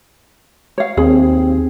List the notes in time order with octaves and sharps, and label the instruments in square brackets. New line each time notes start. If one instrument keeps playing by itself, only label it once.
[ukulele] C#5 F5
[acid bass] D#2 [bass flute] C4 [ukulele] G#4